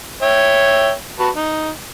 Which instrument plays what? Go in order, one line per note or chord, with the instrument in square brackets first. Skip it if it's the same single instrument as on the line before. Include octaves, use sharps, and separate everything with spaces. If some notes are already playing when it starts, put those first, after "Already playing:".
[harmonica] C#5 E5 G5
F#4 B4 A5
D#4